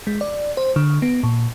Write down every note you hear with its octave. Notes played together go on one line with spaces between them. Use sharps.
G#3
D5
C5
D3
B3
A#2